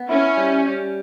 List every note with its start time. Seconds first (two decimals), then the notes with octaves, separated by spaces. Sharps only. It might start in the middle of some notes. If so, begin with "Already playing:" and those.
Already playing: B3
0.09 C#4 E4
0.37 G3
0.66 G3